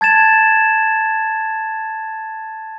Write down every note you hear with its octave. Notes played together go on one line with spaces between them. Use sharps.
A5 G#6 A6 E7